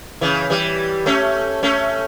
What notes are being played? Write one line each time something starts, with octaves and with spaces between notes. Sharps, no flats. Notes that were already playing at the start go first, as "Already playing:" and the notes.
C#3 E3
E3 G3
A3 C#4
A3 C#4